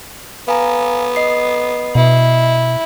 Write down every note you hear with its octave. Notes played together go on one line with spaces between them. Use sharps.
B3 F5 G#5 A#5
D#5 C7
B2 E4